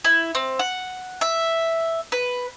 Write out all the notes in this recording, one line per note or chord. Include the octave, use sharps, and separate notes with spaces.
E4
C4
F#5
E5
B4